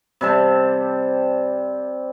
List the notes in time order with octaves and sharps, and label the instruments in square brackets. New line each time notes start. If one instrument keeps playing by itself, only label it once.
[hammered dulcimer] C3 G3 A5